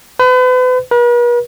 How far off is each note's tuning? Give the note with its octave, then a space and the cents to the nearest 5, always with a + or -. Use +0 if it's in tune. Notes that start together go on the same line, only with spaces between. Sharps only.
B4 +40
B4 -45